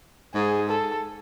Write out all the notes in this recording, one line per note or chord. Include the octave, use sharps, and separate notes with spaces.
G#2 G#4
A4